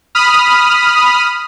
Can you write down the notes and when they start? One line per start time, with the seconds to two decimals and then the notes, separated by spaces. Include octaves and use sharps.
0.15 B5 D#6 F6